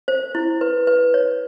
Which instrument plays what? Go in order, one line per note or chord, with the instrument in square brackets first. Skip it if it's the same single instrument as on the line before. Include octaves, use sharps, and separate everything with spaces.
[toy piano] C5
E4
B4
B4
C#5